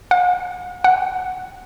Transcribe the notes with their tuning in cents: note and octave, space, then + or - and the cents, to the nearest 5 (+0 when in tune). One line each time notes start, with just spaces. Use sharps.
F#5 -45
F#5 +0